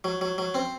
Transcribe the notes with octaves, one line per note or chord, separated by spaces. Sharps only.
F#3
F#3
F#3
C4